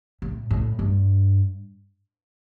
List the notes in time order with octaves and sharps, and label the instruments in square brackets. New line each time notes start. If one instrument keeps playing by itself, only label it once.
[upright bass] A2
A2
G2